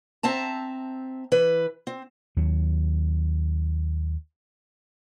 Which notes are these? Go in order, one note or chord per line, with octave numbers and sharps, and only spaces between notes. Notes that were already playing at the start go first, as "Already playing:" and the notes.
C4 E5 A5 A#5
E3 B4
C4
D#2 F#3